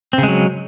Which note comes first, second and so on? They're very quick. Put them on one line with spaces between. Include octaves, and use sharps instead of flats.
C4 C#3 G#3 F#3